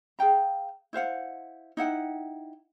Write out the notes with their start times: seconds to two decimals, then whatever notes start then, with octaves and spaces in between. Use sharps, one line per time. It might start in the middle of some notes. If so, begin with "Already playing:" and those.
0.19 G#4 F5 G5 A#5
0.93 E4 C5 F5 F#5
1.77 D#4 E4 F#5 G5